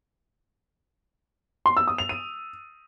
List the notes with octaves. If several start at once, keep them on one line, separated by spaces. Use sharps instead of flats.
C6
E6
D#6
F7
D#7